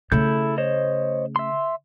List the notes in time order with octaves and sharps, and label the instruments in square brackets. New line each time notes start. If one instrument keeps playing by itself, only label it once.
[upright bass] C#3 A3 [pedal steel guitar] E4 A4 G6
[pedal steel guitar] C5 C#5 D#5
E5 C6